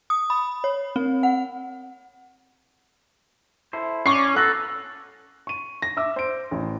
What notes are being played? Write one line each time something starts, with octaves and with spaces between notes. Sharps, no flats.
D#6
B5
C#5
C4
F#5
E4 A4 C5
C#4 D5 C#6 C7
B3 A4 A#5 F#6
C#6 D#7
A#6
E5 D6 E6
C5 D7
A1